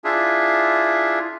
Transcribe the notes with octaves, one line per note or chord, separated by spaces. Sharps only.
D4 E4 F4 G#4 E5